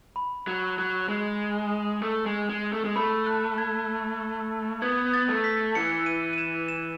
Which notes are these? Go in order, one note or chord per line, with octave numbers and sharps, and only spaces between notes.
B5
F#3
F#3
G#3
A3
G#3
G#3
A3
G#3
A3 B5
F#6
G#6
B3 G#6
A6
A3
B6
E3 C#7
D#7
D#7
E7
E7